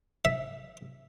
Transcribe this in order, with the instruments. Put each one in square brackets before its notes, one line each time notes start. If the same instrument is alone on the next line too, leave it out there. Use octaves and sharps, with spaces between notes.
[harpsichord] E5